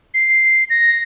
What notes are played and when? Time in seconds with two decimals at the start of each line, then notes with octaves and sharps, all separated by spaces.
0.14 C7
0.70 A#6